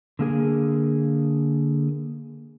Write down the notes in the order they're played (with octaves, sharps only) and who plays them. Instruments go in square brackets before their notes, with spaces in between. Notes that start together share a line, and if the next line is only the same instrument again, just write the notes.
[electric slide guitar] D3 A#3 G#4 A#4